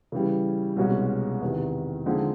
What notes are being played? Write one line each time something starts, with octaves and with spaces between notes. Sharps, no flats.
C#3 E3 G3
C2 B2 G#3 C#4 F#4
E2 C3 D#3
D3 F3 G#3 C4 D#4